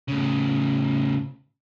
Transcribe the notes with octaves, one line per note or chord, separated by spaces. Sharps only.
A2 C#3